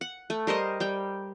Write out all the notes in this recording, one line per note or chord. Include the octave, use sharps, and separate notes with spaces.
F#5
A3
G3 A#4 C5 D#5
G3 G5